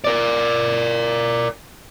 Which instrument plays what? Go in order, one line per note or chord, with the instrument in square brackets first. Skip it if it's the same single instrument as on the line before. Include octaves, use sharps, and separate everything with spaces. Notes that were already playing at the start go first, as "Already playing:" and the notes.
[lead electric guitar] A#4 D5